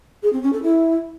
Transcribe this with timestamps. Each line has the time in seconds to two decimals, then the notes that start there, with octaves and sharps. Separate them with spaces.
0.23 G#4
0.33 C4
0.43 C#4
0.53 A4
0.63 E4